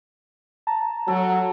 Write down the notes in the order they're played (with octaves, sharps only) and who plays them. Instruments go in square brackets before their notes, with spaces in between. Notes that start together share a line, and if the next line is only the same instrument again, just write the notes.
[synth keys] A5 A#5
[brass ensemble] F#3 [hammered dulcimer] A4